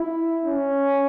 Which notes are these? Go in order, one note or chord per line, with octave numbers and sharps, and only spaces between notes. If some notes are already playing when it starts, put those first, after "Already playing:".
Already playing: E4
C#4